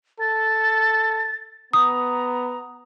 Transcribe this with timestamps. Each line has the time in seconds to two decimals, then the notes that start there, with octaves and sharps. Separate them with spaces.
0.20 A4 A6
1.73 B3 A#5 D#6